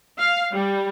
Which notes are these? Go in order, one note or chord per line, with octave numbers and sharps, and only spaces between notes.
F5
G3